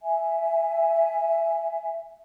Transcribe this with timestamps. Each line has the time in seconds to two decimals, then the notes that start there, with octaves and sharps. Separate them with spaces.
0.02 E5 G#5